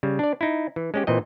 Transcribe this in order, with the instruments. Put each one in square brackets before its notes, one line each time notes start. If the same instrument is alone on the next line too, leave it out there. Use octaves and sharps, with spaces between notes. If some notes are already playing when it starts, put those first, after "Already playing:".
[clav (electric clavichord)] C#3 G3
D4 D5
D#4 E4
E3
G#3 C#4 G4
A#2 E3 C4 D#5